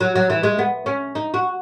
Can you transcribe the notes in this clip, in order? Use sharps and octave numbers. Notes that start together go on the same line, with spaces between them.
F#3
F#3
E3
G#3
B3
C#4
D#4
F#4